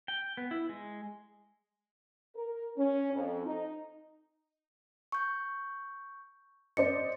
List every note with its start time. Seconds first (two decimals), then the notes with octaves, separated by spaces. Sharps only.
0.08 G5
0.37 B3
0.51 E4
0.69 G#3
2.36 A#4
2.77 C#4
3.13 F2
3.45 D#4
5.12 C#6 G6
6.77 C5 D5 D#5 C#7